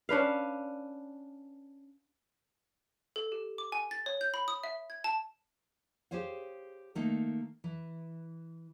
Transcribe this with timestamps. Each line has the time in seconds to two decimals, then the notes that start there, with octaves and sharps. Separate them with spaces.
0.09 C#4 D4 B4 F5
3.16 A4
3.32 G4
3.58 D6
3.72 G#5
3.91 A6
4.06 C#5
4.21 G6
4.34 B5
4.48 D#6
4.64 E5
4.90 G#6
5.04 A5
6.11 G4 G#4 C5 C#5 F5
6.95 D#3 A3 A#3 D#4
7.64 E3